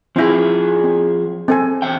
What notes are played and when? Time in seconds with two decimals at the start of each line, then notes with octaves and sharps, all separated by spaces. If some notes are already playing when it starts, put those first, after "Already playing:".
0.16 F3 C4 E4 G#4
0.84 C4
1.48 C4 A4 G#5
1.82 E2 E5 G5